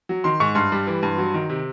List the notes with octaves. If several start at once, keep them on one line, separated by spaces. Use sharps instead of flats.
F#3
D#3 C6
G#2 C#6
G2 C6
G3
E3
G2
F#3
D#3
C3